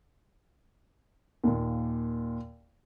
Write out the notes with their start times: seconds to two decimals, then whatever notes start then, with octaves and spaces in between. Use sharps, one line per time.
1.44 D#2 A#2